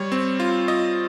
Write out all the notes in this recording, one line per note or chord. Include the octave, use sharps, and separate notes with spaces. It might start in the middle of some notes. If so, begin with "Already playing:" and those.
Already playing: G3 C#5
C4
F4
F4 D#5